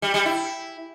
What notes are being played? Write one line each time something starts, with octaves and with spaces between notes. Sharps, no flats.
G3
G3
E4